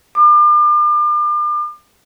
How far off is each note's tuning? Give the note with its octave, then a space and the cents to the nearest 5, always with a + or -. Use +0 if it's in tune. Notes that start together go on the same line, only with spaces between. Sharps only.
D6 +40